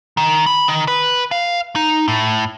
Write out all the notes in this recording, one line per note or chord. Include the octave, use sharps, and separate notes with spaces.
D#3
B5
D#3
B4
F5
D#4
A2